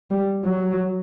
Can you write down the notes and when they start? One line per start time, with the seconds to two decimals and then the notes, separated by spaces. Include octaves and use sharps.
0.11 G3
0.45 F#3